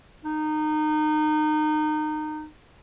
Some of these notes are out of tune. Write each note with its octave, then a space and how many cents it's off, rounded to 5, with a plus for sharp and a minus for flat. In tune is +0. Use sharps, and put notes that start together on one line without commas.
D#4 -25